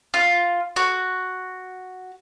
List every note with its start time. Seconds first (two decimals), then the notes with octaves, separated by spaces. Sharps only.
0.14 F4
0.76 F#4